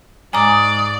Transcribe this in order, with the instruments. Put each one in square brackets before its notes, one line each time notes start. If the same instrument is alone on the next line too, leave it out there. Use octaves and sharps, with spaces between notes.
[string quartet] G#2 D5 [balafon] G#5 A#5 D6 [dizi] D#6